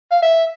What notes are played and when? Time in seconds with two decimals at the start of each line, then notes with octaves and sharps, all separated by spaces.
0.11 F5
0.22 E5